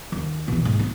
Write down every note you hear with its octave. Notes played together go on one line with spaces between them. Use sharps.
D#2
B2 E3
G#2
C4